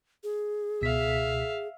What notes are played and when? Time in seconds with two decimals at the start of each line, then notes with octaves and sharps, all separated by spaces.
0.24 G#4
0.81 C#2 B2 E5 F5 B6